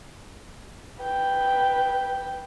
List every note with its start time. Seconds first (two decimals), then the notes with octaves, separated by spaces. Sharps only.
1.02 B4 G5